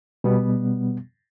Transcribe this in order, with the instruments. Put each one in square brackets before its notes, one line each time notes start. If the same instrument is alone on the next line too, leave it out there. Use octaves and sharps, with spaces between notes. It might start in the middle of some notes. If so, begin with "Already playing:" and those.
[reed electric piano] B2 G3 B3